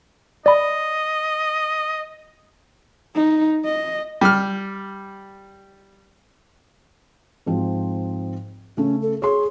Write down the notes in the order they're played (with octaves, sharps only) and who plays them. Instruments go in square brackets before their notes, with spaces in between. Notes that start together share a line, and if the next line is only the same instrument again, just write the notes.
[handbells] D5 B5 [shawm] D#5
[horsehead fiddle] D#4
D#5
[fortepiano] G3 F6
[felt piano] G#2 F3 C4
[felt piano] C#3 A3 [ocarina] C#4
[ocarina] A4
[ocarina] G#4 [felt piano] C#5 C6